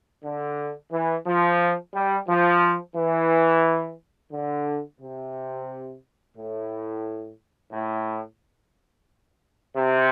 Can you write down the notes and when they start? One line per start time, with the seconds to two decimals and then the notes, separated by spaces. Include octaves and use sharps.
0.24 D3
0.92 E3
1.26 F3
1.94 G3
2.28 F3
2.96 E3
4.32 D3
5.00 C3
6.36 A2
7.72 A2
9.77 C3